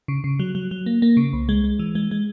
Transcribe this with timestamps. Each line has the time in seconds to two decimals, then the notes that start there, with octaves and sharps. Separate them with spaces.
0.08 C#3
0.24 C#3
0.39 F#3
0.55 F#3
0.71 F#3
0.86 A#3
1.02 A#3
1.17 C#3
1.33 C2
1.49 G#3
1.64 G#3
1.79 E3
1.95 G#3
2.11 G#3